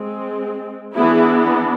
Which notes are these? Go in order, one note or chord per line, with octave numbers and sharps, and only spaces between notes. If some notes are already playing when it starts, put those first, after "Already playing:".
Already playing: G#3 C4
E3 B3 D4 E4 G#4